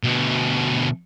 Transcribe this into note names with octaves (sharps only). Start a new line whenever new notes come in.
D2 B2